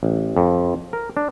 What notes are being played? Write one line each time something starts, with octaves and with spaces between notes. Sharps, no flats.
A1
F2
A#4
D4